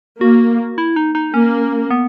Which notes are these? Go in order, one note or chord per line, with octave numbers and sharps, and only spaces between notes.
A#3 F#4
E4
D#4
D#4
A#3 C#4
B3